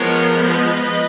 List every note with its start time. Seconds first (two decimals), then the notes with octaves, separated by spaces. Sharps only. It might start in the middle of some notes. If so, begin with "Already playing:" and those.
Already playing: F3 G#3 B3 A#4 C#5
0.42 B4 D#5